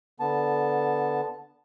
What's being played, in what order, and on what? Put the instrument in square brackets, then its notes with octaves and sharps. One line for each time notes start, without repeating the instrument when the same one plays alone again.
[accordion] D3 B3 A5